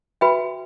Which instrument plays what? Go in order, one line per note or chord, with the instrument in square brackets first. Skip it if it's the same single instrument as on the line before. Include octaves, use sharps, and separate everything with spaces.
[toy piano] F#4 B4 E5 G5 B5